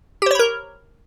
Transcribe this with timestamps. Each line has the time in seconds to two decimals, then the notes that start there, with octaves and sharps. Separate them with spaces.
0.22 G4
0.26 C5
0.31 C#5
0.35 B5
0.39 A#4